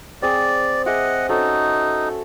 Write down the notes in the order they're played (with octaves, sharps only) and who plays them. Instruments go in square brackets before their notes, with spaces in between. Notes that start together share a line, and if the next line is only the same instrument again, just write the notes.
[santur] C4 G#4 [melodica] D5
[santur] G#4 E5 D6 [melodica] D#5 F#5
[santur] C#4 F#4 A4 [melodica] D#4